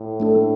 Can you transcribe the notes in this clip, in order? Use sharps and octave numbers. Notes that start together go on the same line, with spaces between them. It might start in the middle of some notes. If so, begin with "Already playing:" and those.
Already playing: A2
A3 D4 A4